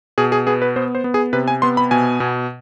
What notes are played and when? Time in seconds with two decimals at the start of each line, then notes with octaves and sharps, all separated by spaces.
0.18 B2 G#4
0.32 G#4
0.47 B3 G#4
0.62 B4
0.76 B3 C5
0.95 C5
1.04 B3
1.14 G#4
1.33 C3 B4
1.48 G#5
1.62 B3 C6
1.77 B5
1.91 B2 G#5
2.20 B2